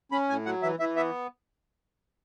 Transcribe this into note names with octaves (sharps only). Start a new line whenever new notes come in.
C#4 B5
A2 G#5
F#3 F#5
E3 E5
E3 E5
B3 E5